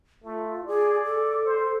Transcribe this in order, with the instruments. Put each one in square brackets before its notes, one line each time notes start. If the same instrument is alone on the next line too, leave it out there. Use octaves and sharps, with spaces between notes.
[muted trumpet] A3 [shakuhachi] F4
[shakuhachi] G#4 [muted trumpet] D5
[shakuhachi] A4
[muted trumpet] C5